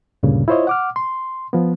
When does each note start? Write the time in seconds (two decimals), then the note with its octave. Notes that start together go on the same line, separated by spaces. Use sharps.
0.23 D2 G2 A#2 C#3
0.48 E4 F4 C5 C#5 D#5
0.67 F#5 D6 F6
0.96 C6
1.53 F3 B3